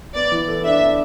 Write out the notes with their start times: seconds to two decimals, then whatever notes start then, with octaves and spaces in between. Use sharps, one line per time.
0.14 B3 D5
0.31 E3
0.48 A4
0.64 D4 E5
0.81 B3